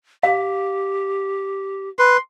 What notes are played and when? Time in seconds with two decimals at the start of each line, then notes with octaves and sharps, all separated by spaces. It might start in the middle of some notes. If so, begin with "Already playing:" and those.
0.23 G4 F5
1.99 B4 C6